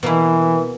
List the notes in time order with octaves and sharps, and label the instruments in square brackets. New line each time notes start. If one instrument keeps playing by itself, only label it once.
[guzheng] B2 A#3 E4 [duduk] E3